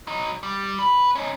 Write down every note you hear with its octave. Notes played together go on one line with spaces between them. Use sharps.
F#3 D#4
G3
B4
C#4 D#4